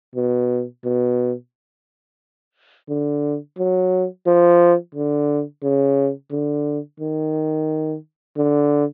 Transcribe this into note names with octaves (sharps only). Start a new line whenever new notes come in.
B2
B2
D3
F#3
F3
D3
C#3
D3
D#3
D3